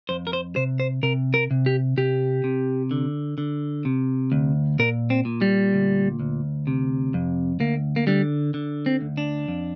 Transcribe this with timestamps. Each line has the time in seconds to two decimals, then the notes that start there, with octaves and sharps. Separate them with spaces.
0.09 F2 C5
0.27 A#4
0.33 C5
0.56 C3 C5
0.80 C5
1.03 C3 A#4
1.34 A#4
1.51 C3
1.66 G4
1.97 C3 G4
2.44 C3
2.91 D3
3.38 D3
3.85 C3
4.32 D2
4.79 A#2 A#4
5.10 C4
5.25 A#2
5.42 G3
5.73 D2
6.20 D2
6.67 C3
7.14 F2
7.60 D2 A#3
7.96 A#3
8.07 D3 G3
8.54 D3
8.86 C4
9.01 D2
9.17 D4
9.48 F2